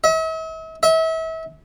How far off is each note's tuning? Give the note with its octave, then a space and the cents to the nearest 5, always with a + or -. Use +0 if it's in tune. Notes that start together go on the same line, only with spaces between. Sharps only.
E5 -45
E5 -35